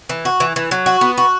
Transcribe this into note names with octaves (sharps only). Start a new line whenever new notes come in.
E3
F#4
E3
E3
F#3
F#4
B3
F#4